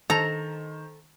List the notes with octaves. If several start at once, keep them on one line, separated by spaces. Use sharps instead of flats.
D#3 A4 C5 A#5 F7